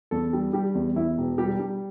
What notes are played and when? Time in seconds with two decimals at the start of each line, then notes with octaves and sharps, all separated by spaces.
0.11 E2 A4
0.33 G3
0.53 G3 G4
0.75 E2
0.96 E2 E4
1.18 E1
1.38 G3 G4
1.59 G3